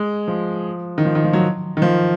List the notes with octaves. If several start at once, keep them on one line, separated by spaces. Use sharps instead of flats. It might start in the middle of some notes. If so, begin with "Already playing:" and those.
Already playing: G#3
F3
D#3
F3
D#3
F3
F#3
D#3
F3